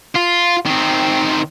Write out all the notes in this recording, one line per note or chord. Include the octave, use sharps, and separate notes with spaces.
F4
D#3 C4